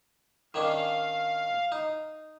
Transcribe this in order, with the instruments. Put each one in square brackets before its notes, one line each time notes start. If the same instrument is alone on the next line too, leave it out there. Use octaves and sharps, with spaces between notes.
[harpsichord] D#3 C#4 D4 [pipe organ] F5
[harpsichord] D#4